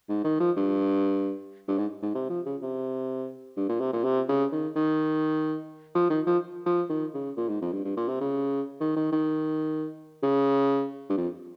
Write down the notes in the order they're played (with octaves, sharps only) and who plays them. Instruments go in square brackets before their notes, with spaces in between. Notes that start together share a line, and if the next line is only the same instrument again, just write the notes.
[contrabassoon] G#2
D#3
F3
G2
G2
G#2
G#2
C3
F3
C#3
C3
G2
A#2
C3
A#2
C3
C#3
D#3
D#3
F3
D#3
F3
F3
D#3
C#3
A#2
G#2
F2
G2
G2
A#2
C3
C#3
D#3
D#3
D#3
C#3
G2
F2